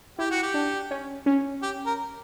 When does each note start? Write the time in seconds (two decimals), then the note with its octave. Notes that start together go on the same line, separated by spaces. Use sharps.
0.19 E4 G4
0.31 F#4
0.43 G4
0.54 D4
0.91 C#4
1.26 C#4
1.62 G4
1.86 A#4